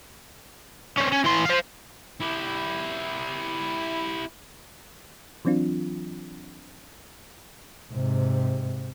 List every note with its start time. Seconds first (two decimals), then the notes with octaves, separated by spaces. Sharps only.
0.97 C4 C#4
1.12 C#4
1.24 E3 C6
1.45 C5 F5
2.20 E4 G4
5.45 E3 F#3 C4 D4 F4
7.92 G#2 C3